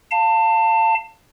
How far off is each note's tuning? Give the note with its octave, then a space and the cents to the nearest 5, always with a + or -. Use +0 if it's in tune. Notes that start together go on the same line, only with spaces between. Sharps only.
F5 +0 A5 +25